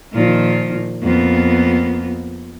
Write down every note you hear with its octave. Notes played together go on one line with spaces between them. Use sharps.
A#2 D#3 F3
F2 A#3 B3